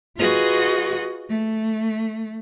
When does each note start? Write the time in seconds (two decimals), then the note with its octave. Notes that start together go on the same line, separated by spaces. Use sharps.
0.18 F4 F#4 G#4 B4 D#5
1.29 A3